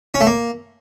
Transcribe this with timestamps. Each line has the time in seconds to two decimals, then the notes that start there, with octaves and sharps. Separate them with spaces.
0.14 C#4
0.21 A3
0.27 A#3